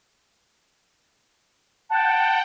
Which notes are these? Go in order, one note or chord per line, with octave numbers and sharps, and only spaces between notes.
F#5 G5 A5